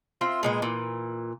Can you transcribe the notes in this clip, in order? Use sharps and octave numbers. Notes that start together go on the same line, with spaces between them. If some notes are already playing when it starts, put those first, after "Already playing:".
C4 F4 E5
A#2 G#3 B3
A#2 E3